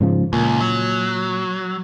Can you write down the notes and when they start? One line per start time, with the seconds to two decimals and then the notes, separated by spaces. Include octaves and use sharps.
0.01 G#2 C#3 F3
0.33 C#2 A#2
0.60 F#3